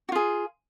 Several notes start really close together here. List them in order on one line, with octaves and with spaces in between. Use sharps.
F#4 F4 G#4